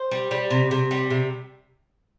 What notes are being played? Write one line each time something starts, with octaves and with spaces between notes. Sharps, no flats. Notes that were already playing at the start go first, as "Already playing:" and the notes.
Already playing: C5
G3
G3
C3
C3
G3
C3